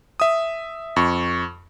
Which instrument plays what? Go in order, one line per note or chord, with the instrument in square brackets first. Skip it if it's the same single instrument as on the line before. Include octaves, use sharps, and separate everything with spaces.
[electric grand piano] E5 D#6
F2 C#6